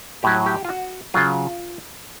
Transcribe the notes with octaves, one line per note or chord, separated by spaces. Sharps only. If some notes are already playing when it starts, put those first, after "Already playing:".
A2 F#3 G4
G4
F4
F#4
C#3 F#3 F4